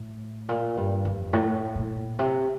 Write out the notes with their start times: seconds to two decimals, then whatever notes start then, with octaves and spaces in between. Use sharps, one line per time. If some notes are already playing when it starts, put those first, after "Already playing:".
Already playing: A2
0.49 A#2
0.77 G2
1.05 F2
1.33 A2
1.75 A#2
2.19 C3